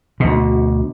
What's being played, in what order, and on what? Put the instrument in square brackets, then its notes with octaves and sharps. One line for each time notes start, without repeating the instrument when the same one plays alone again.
[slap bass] D2 B2